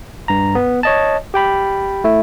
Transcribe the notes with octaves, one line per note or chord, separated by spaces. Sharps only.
G2 A#5
B3
C#5 D#5 A5
G4 G5 B5
A3 E4 E5